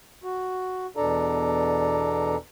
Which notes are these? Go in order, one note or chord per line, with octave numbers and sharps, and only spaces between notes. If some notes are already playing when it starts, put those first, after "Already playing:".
F#4
E2 B2 D4 A4 D5 A#5